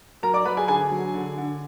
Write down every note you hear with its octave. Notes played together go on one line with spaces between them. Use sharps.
F#3 A#4 A#5
D5 D6
F#3 B4 B5
G#4 G#5
D3 G#4 G#5
F#3
D3
D3